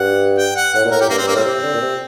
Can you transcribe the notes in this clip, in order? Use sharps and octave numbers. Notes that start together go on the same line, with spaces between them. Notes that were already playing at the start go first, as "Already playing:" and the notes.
Already playing: G2 F#5
G5
F#5
A2 F#5
A#2
A2 A#4
G4
G2 A#3
C4
G2
A#3
A2 G3 C4
C3
D3
A#2
C3